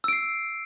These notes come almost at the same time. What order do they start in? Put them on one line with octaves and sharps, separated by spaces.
E6 D7 C7